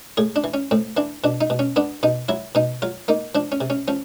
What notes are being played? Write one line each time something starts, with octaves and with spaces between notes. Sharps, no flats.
A2 G#4
D4
E3
C#4
A2 C4
E3 D4
B2 D4
D#4
B2
C#4
B3 D4
B2 D#4
F#3 E4
B2 D#4
F#3 F4
A#3 D#4
F3 D4
C#4
C3
C#4
F3 C#4